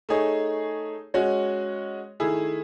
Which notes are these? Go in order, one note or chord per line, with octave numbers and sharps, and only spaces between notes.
A3 D#4 G#4 C#5
G#3 C#4 F#4 C#5
D#3 A3 E4 G#4